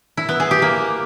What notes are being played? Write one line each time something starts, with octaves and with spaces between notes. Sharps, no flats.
E4
B3
G#4
G4
A#3